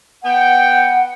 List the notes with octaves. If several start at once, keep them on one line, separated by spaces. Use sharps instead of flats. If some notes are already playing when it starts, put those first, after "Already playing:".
B3 F#5 G5